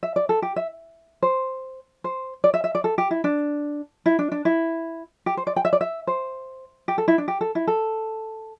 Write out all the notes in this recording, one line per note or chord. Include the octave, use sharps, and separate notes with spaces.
E5
D5
A4
G4
E5
C5
C5
D5
E5
E5
D5
A4
G4
E4
D4
E4
D4
D4
E4
G4
C5
D5
G5
E5
D5
E5
C5
G4
A4
E4
D4
G4
A4
E4
A4